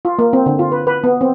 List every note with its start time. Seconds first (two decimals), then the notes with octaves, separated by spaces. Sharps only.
0.05 F4
0.19 A#3
0.33 C4
0.46 D3
0.59 F4
0.72 B4
0.87 B4
1.04 B3
1.21 C4